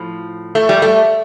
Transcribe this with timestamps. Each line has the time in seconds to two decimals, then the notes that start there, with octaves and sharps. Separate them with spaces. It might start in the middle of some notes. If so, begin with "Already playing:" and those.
Already playing: A2 F3
0.55 A3
0.69 G3
0.82 A3